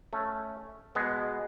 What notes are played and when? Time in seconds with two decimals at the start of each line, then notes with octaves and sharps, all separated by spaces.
0.13 A3 C#4
0.95 B2 G#3 B3